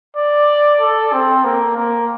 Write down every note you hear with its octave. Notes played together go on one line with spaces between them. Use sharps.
D5
A4
C4
A#3
A#3